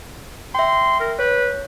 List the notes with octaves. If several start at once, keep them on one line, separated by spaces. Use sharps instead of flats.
E5 G5 C6
A#4
B4 C#5